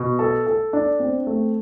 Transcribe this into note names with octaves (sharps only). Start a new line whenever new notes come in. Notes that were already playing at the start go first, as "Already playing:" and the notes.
Already playing: B2
A4
A4
D4
C4
A3